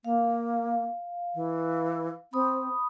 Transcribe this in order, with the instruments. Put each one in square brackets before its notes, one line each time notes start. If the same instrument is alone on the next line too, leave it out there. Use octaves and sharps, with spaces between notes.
[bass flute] A#3 [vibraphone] F5
[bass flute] E3
[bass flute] C4 [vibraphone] B5 D#6